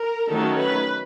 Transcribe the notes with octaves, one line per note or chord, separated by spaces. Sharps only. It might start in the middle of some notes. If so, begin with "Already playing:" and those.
Already playing: A#4
D#3 F#3 A3 C#4 A4
B4